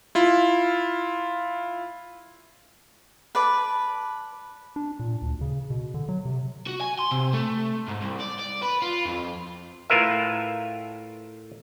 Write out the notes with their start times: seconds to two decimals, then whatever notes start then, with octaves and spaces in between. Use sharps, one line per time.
0.15 E4 F4
3.35 B4 D5 A5
4.76 D4
5.00 A#2
5.22 D2
5.41 C#3
5.70 B2
5.94 D3
6.09 F#3
6.25 C3
6.67 F#4
6.81 G#5
6.99 C6
7.11 C3
7.33 A3
7.88 G#2
8.01 C2
8.20 D5
8.39 D5
8.62 B4
8.82 F4
9.06 F2
9.90 A2 F4 A#4 B4 E5